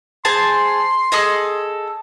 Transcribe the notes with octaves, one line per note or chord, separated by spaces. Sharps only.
G#4 C5 A5 C6
G#4 A4 D#5